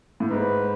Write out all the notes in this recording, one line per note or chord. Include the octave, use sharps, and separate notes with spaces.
A2
G#2 B4